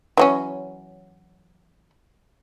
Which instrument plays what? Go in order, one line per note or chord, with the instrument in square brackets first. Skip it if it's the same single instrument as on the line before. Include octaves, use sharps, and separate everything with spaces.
[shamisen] E3 F#3 C#4